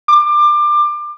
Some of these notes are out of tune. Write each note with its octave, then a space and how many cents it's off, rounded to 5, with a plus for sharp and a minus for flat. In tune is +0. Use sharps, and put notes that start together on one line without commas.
D6 +25